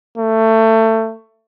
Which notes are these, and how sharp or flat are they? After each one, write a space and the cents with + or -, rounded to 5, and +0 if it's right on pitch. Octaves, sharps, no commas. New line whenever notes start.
A3 +20